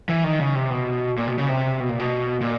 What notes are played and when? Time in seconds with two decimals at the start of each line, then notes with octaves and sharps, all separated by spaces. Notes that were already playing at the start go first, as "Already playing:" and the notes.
0.09 E3
0.24 D#3
0.40 C#3
0.55 C3
0.70 B2
1.17 A#2
1.28 B2
1.38 C#3
1.49 C3
1.80 B2
1.89 A#2
2.00 B2
2.41 A#2